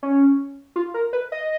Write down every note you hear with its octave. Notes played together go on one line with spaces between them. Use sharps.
C#4
F4
A#4
B4
D#5